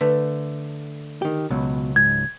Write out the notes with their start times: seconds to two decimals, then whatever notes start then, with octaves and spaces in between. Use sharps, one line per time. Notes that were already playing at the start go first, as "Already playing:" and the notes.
0.01 D3 A3 B4
1.22 D#3 G4
1.50 C#2 B2 F#3
1.96 G#2 G#6